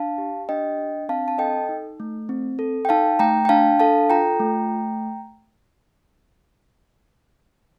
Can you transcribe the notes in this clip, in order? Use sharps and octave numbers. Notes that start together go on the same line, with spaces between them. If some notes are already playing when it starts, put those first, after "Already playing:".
Already playing: D4 F5 A5
G4
D4 D#5 G5
D4
C4 F5 A5
A5
A4 D#5 G5
D#4
A3
C4
A4
G5
D#4 F5 A5
A3 G5 A#5
G5
D4 F5 A5
A4 F5 A5
F4 G5 A#5
A3